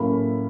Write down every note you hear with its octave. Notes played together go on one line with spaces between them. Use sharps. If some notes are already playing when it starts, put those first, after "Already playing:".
Already playing: A2 F#3 A#3 C#4 B5